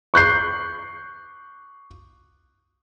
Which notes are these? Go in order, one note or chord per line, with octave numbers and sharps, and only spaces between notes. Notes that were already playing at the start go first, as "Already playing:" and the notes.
C#6 F#6 G6 C7